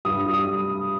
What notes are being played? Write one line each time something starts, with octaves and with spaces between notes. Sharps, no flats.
G2 D#6
G3
D#6